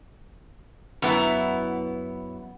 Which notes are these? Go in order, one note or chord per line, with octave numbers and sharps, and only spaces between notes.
F#2 B3 E4 A#5